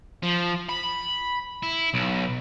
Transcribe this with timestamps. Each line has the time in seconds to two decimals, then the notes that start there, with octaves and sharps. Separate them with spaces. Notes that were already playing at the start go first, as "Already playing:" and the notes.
0.23 F3
0.69 B5
1.63 E4
1.94 B1